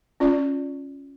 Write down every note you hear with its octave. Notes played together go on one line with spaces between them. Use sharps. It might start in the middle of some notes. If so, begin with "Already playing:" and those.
C#4 F4 D5